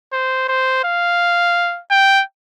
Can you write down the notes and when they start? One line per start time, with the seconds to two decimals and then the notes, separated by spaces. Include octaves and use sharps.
0.13 C5
0.49 C5
0.84 F5
1.91 G5